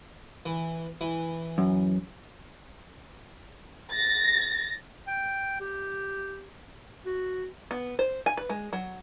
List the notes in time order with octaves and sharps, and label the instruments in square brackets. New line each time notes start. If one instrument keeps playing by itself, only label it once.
[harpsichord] E3
E3
[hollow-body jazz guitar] F#2
[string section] A6 A#6
[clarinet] G5
G4
F#4
[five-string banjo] B3
C5
G#5
B4
G#3
F#3